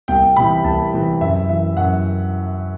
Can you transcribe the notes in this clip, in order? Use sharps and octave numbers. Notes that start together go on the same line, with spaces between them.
C2 G5
C3 E3 B5
C2 A5
C3 E3
F#2 E5
E3 E5
F#2 F#5